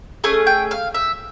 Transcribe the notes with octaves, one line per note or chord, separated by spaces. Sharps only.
A3 C#4 G#4 G#5
G5
F5
E5